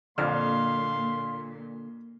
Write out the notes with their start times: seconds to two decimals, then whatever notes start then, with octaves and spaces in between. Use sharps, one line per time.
0.18 F2 A#2 D3 D4 F5 C6 F6